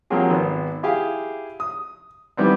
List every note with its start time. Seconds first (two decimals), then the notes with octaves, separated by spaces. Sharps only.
0.10 F3 F#3 A#3 C4 G4 G#4
0.30 G#1 B3
0.83 E4 G4 G#4 F5
1.60 D#6
2.37 D#3 E3 G3 B3 C4